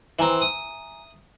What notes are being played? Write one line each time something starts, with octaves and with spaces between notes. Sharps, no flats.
E3 C4 E5 G#5 A#5
D#6